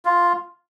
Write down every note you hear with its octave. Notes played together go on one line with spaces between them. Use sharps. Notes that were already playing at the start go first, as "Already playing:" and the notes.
F4